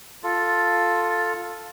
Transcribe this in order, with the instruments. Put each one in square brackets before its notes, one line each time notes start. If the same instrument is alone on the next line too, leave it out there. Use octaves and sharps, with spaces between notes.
[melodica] F4 A4